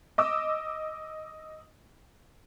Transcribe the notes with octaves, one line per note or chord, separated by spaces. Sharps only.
D#5 D6 E6